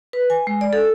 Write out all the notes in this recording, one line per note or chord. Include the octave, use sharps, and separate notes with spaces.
B4
G#5
G#3
D5
A4